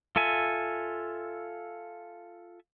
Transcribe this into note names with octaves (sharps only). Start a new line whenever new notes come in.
F4 A4 E5 G#5